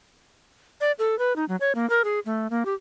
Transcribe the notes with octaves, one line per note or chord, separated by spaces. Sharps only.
D5
A4
B4
D#4
F#3
C#5
A#3
A#4
G#4
A3
A#3
G4